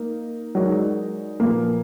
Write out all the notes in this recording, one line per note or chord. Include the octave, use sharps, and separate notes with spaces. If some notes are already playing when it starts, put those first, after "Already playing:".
Already playing: A#3 D#4 A#4
F#3 G#3 D#4 A#4 D5
A#2 F3 A#3 B3